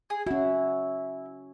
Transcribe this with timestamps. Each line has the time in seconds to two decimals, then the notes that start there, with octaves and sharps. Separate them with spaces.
0.10 G#4
0.27 C#4 E4 F#4